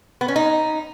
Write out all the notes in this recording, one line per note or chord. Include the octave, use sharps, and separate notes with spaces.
B3
C#4
D#4